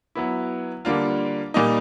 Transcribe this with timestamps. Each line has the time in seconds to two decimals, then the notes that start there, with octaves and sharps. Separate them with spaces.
0.15 F#3 B3 E4
0.85 D3 G3 A#3 D4 F4
1.54 A#2 G3 A#3 D#4